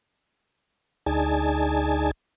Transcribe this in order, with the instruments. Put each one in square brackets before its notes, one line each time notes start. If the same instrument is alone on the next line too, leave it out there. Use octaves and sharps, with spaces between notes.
[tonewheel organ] D2 D#4 G#4 D5 G#5 A5